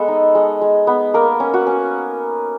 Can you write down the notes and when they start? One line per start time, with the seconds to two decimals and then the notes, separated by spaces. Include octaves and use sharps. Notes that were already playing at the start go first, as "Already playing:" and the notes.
Already playing: G#3 B3 A4
0.08 D#4
0.35 G#3
0.61 G#3
0.87 B3
1.14 A#3 A#4
1.40 C#4
1.54 F#4
1.67 C#4